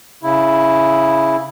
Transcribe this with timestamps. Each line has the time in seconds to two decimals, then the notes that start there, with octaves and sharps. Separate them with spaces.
0.23 C#3 E4